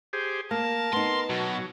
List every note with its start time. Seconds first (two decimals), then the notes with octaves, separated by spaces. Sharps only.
0.13 G4 G#4 C5
0.51 A#3 A#4 A5
0.93 B3 D#4 C6
1.29 B2 F#3